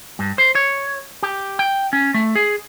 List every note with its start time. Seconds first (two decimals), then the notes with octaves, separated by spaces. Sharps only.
0.19 G2
0.38 C5
0.55 C#5
1.23 G4
1.59 G5
1.93 C#4
2.14 A3
2.35 G#4